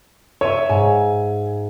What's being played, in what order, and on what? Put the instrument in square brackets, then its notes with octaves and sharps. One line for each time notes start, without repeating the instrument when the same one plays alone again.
[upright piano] C#5 [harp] E5 D#7 E7
[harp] G#2 [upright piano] G#5